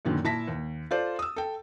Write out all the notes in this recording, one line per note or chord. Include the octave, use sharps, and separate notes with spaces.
F#2 A#2 D3 D#3
A#2 E4 E5 A5 A#6 B6
D#2
F4 A4 C5 D5
D#6 E6
A4 G5